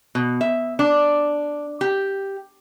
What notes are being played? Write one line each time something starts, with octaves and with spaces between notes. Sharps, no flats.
B2
E5
D4
G4